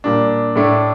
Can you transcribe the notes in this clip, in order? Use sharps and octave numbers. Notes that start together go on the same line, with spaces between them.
A#2 G3 D4
A2 A3 D4